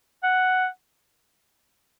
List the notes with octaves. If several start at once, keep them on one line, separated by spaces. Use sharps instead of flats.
F#5